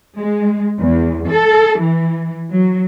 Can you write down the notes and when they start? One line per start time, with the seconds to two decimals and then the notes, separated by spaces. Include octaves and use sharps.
0.17 G#3
0.79 E2
1.30 A4
1.80 E3
2.50 F#3